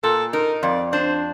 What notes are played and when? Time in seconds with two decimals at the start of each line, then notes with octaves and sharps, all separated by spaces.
0.03 A#2 A4
0.33 D#4 A#4
0.63 F2 D5
0.92 D4 C5